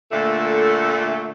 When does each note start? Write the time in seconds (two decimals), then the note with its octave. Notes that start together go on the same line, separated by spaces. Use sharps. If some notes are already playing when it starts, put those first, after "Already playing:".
0.12 A#2 D3 A3